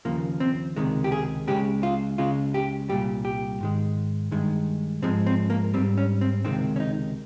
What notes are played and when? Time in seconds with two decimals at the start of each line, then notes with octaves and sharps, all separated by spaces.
0.05 D#2 C#3 F3 A#3
0.40 C4
0.76 C#2 C3 D#3 G#3
1.04 G4
1.12 G#4
1.47 C#2 C#3 G#3 G4
1.83 F4
2.18 C#2 C#3 G#3 F4
2.54 G4
2.89 C2 A#2 G3 G4
3.25 G4
3.61 G#2 D#3 G#3
4.31 G2 D#3 G#3
5.02 G#2 F3 G#3 C4
5.27 C4
5.50 A#3
5.74 G3 C4
5.78 G#2
5.98 C#4
6.21 C4
6.45 C#2 C3 D#3 G#3 C4
6.76 C#4
6.80 D#4